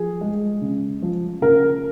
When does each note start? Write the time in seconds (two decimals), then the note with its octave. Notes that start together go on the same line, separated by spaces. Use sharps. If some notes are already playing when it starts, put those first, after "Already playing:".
Already playing: F3 G#4
0.21 G#3
0.61 C#3
1.02 F3
1.41 C#3 A#4